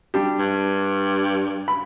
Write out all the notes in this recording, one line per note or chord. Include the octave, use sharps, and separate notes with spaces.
G3 D4 G4
G2
B5